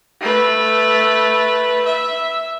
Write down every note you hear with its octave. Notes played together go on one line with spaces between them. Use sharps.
A3 B4
E5